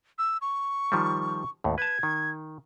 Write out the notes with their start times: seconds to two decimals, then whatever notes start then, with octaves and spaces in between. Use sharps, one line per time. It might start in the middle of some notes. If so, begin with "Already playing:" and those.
0.18 E6
0.41 C#6
0.92 D#3 F3 G3
1.64 D#2 A2
1.78 B4 A5 G#6
2.03 D#3